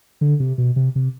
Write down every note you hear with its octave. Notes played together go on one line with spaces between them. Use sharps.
D3
C3
B2
C3
C3